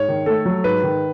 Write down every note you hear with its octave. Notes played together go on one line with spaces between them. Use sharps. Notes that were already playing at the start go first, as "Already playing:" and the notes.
Already playing: G#2 C#5
D#3
A3 A4
F#3
G#2 B4
D#3